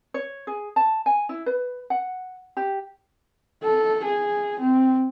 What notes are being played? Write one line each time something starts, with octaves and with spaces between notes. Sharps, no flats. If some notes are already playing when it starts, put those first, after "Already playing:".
C#5
G#4
A5
G#5
E4
B4
F#5
G4
A4
G#4
C4